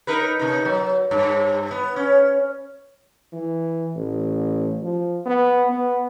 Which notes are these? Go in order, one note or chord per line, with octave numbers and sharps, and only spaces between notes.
D#4 A#4 B4
C3 D#4
F#3
G2
B3
C#4
E3
A1
F3
B3
B3